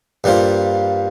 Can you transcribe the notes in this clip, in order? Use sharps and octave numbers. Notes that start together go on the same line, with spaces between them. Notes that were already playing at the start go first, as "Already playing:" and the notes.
G2 G3 A#3 F4 C5